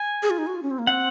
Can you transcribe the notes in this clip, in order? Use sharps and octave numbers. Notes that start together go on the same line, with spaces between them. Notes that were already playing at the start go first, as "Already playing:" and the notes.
Already playing: G#5
G#4
F4
D#4
F#4
F4
C#4
C4
A#3
C4 F#5